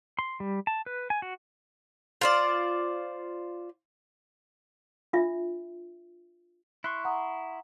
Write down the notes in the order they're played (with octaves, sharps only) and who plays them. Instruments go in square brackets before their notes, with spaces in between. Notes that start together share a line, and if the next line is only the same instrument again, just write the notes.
[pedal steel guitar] C6
G3
A5
B4
G#5
F#4
[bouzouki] F4 C5 D5
[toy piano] D4 F4 E5
[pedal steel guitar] E4 C6 C#6 [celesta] F#6
[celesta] F#5 A#5 D#6